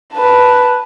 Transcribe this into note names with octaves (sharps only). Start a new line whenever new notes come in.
B4 A5